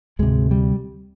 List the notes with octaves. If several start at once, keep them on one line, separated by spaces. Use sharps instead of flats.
D2 G#2 C3 G#3
G3